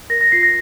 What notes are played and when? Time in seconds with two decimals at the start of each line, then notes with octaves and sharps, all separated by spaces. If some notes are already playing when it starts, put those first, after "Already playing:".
0.10 A#4 A#6
0.21 A#6
0.32 F4 C7
0.43 A#6